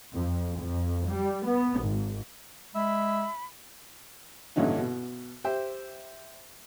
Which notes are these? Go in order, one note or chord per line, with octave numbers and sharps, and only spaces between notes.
F2
F2
G3
B3
G#1
G#3 E5 B5
A1 G2 A#2 D3 C#4 D#4
B2
G4 C5 E5 G5